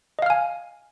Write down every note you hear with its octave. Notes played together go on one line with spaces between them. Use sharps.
D#5 F5 G#5 F6